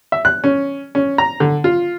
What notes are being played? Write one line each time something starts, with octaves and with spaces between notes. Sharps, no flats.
E5
F#6
C#4
C#4
A#5
D3
F4